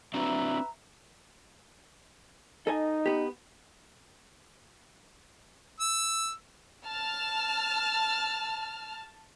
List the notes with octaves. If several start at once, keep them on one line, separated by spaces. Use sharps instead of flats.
C4 D4 F#4 B4 E5 A#5
D#4 A4 D#5 G#5
B3 G4
E6
A5 F6